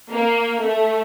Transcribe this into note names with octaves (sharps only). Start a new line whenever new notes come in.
A#3
A3